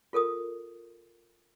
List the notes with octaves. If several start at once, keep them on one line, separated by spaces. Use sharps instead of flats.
F4 A4 A#4 D#6